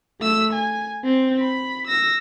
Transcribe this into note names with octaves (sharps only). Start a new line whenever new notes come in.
A3 E6
G#5
C4
B5
E6 A#6